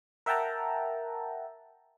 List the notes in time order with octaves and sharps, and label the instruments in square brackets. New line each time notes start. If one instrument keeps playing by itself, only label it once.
[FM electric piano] A#4 E5 F#5 G5 A5 A#5